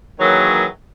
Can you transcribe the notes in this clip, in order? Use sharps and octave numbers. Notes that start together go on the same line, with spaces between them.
D#3 E3 F#3 A#3 G#4 C#5